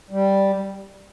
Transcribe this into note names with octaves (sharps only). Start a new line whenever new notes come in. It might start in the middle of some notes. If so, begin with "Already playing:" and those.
G3